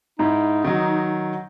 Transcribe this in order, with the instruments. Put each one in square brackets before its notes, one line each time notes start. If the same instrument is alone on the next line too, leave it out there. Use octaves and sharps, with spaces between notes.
[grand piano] G#2 E4 [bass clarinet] D#4
[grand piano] D#3 F#3